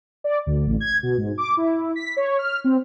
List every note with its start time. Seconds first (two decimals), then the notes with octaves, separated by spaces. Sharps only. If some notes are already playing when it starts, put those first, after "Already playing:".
0.24 D5
0.46 D2
0.67 A1
0.80 G#6
1.03 B2
1.17 G#2
1.38 D6
1.57 E4
1.96 B6
2.17 C#5
2.39 F6
2.64 C4